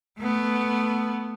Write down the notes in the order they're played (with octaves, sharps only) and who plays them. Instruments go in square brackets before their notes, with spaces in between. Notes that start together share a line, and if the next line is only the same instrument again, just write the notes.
[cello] A3 B3